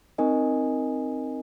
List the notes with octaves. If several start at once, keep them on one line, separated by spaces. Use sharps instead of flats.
C4 D#4 A#4 D#5 G#5